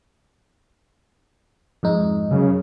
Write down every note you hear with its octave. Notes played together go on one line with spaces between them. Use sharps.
F2 G#2 D#4
F#2 C#3